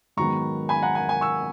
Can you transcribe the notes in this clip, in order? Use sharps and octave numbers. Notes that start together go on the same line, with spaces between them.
G#2 D#3 F#3 B3 A#5 C#6
G#5 B5
F#5 A#5
G#5
G#5
C#6 E6